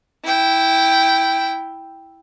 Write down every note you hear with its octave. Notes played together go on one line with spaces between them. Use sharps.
E4 G5